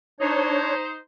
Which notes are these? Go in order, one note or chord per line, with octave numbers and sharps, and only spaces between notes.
D4 D#4 C5 C#5